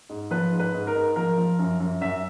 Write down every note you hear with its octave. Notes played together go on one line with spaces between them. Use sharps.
G#2
F3 B4
G#2
B4
G#2
A#4
G#2
F3 A#4
F3
F#2
F#2
F#2 E5